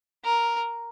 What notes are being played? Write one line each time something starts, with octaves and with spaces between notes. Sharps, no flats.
A#4